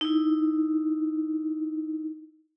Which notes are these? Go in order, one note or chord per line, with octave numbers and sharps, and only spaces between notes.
D#4 E4